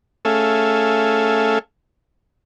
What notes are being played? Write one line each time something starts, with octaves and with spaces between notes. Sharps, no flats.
A3 C#4 G#4 A4 E5 F5